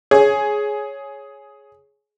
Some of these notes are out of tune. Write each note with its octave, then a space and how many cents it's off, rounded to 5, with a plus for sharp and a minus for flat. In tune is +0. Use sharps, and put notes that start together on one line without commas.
G#4 +10 C#5 +0